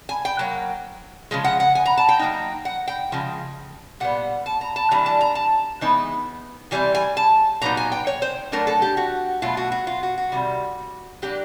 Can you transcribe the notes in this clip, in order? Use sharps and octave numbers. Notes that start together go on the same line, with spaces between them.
G#5
G5
F#3 A#3
C#3 F3 G#3
F#5
F#5
G#5
A#5
A5
G5
F#3 A#3 D#4
F#5
G5
C#3 F3 G#3
A#2 G3 B3 F#5
A5
A#5
A5
E3 G3 A#3 D4 A#5
A5
A#5
A5
E3 G#3 B3 D#4
E3 G3 C4 G#5
G#5
A5
A#2 F#3 B3 D#4 A#5
G#5
G5
C#5
C5
F#3 A3 D4 A#4
A4
G4
F#4
B2 F#3 A3 F4
F#4
F#4
F4
F#4
F#4
C3 D#3 G3
F#3 A#3 D4 G4